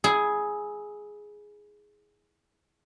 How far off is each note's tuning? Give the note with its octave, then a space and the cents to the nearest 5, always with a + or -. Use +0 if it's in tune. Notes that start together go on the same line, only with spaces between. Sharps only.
E4 -20 G#4 +5